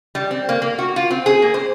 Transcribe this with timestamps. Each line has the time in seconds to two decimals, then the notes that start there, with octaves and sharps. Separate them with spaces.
0.15 G3
0.31 C4
0.49 A#3
0.62 A#3
0.78 F#4
0.96 F4
1.11 C4
1.26 G#4
1.42 A#3
1.54 C5